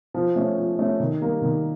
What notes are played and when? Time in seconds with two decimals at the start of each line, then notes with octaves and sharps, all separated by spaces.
0.14 F3
0.36 A3 C#4
0.58 F3
0.79 A3 C#4
1.00 D#3
1.21 G3 A#3
1.42 D#3